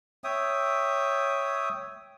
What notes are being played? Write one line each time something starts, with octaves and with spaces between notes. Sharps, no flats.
C#5 E5 G5 D#6